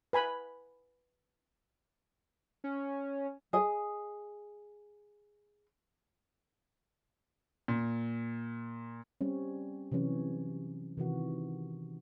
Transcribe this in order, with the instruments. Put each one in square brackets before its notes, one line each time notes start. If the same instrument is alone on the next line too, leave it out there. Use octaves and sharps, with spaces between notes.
[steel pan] B4 G#5 B5
[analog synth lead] C#4
[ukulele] G#4 D#5
[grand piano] A#2
[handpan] G3 C4 C#4
C3 E3 F#3 C#4
C3 D#3 E3 F#4